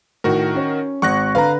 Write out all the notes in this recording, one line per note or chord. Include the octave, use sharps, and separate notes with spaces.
A2 D#3 F#4 A#4
C#4
G#1 C#6 F#6 A#6
D3 B4 F5 A#5